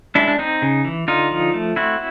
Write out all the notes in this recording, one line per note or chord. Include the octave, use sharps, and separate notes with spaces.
G#3 D4 E4
D4
C4 D#4
C#3
E3
D3 D#4 F4
F3
A3
C4 E4 F#4